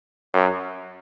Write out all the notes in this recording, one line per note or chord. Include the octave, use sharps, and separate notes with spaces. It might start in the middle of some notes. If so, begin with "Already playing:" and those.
F#2